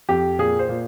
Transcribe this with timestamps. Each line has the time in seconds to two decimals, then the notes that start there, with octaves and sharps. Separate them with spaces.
0.09 F2 G4
0.39 A#2 G#4
0.59 C5
0.69 A#2